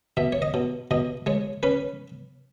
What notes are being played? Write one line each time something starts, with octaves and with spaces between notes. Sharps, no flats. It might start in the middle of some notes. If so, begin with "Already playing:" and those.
B2 E5
C#5
D#5
B2
B2 D#5
G#3 C#5
C#4 B4